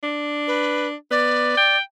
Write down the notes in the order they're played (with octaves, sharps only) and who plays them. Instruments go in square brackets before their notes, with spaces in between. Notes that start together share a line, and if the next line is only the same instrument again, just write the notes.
[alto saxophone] D4
[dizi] B4
[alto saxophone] B3 [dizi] D5
[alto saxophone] G5